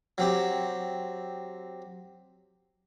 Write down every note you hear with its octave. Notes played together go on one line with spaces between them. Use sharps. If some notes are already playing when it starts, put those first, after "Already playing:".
F#3 C4 G4